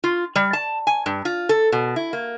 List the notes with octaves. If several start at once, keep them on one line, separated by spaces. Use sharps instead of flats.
F4
G3
A5
G#5
G2
F4
A4
B2
E4
A#3